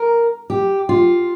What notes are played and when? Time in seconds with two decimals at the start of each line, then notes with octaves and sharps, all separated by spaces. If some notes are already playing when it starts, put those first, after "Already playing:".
Already playing: A#4
0.50 G4
0.89 F4